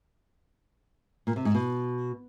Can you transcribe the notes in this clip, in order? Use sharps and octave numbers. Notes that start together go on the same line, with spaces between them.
A#2
C3
G#2
B2